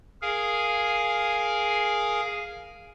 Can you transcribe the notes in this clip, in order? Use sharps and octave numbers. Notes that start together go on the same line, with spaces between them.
G#4 A#4 F5 G#5